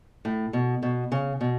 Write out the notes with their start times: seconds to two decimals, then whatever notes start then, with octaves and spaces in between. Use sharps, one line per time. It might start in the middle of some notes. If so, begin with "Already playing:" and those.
0.25 A2
0.53 B2
0.83 B2
1.12 C#3
1.41 B2